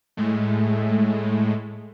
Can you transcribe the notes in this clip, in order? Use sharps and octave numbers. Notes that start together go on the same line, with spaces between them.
A2 G#3 A3